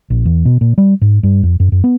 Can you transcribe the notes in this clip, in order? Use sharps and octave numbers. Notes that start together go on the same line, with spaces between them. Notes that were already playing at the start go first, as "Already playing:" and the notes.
A#1
E2
B2
A#2
G3
G#2
G2
F2
F#2
F#2
B3